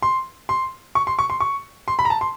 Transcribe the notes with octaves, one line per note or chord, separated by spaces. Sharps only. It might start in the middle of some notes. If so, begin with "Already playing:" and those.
C6
C6
C#6
C6
C#6
C6
C#6
C6
B5
A#5
A5
C6